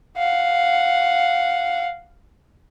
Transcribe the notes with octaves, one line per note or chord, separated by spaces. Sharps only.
F5 F#5